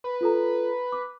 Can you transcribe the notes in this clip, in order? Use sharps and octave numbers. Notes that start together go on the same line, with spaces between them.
B4
F4 A4 A#5
D6